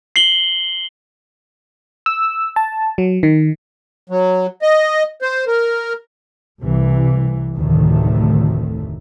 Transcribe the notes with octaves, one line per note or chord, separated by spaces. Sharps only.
C7 F#7 G7
E6
A5
F#3
D#3
F#3
D#5
C5
A#4
C2 C3 E3
F1 D2 A2 D#3 A3